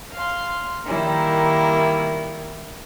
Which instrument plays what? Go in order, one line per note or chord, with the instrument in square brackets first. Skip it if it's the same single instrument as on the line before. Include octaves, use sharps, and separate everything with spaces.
[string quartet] F5 C6
D#3 G3 A#3 E4